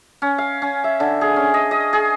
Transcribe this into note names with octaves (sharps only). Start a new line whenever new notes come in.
C#4
F5
C#4
E5
D3
G#4
C#4
D#5
D#5
G#4